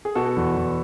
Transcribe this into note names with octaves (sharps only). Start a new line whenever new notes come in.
G#4
B2 F#4 A4
E2
E2